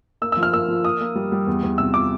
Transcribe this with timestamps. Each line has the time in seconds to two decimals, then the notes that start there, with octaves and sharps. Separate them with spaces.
0.22 A#3 E6
0.32 E6
0.37 F3
0.43 F6
0.53 A#3 E6
0.68 F3
0.84 A#3 D#6
1.01 A#3
1.16 G3
1.32 G3
1.47 E2
1.63 E2
1.78 C3 E6
1.94 D6